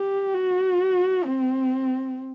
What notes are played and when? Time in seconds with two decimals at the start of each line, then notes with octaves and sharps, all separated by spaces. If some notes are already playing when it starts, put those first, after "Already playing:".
Already playing: G4
0.34 F#4
1.25 C4